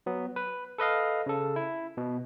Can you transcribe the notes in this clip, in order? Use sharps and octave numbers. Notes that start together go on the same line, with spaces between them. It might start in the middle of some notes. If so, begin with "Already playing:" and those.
F#3 B3
B4
A4 B4 D#5 F5
C#3 A4
E4
B2